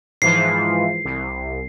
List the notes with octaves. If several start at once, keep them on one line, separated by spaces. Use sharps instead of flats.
G#2 E3 F3 C7
C2